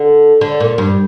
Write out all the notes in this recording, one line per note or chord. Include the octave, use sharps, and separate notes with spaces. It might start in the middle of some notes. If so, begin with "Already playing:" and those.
Already playing: D3
D3
A#2
G2